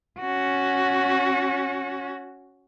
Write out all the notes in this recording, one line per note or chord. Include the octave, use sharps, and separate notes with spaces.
C#4 F#4